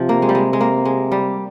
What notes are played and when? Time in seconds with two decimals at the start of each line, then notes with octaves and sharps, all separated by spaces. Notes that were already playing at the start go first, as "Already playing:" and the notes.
Already playing: C3 F3
0.09 A#3
0.22 G#3
0.29 G3
0.35 G#3
0.53 G#3
0.61 A#3
0.85 G#3
1.12 G3